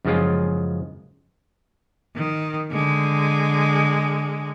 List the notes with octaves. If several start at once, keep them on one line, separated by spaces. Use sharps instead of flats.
F#2 C#3 F3 G#3 F4
D#3
D3 G#3